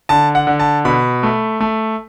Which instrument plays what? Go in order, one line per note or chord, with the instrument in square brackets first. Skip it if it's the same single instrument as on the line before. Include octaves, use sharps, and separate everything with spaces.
[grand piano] D3 A5
F#5
D3
A5
B2 B5
A3
A3